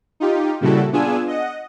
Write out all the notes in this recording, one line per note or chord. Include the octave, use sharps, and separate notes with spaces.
D#4 F4 G4
A#2 C#3 G3 E4 F#4 A4
B3 D4 F4 G#4 G#5 E6
D#5 F#5